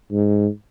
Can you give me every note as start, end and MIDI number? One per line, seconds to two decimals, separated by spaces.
0.11 0.48 44